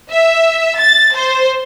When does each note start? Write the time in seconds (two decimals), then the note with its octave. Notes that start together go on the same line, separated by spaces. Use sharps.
0.11 E5
0.78 A6
1.14 C5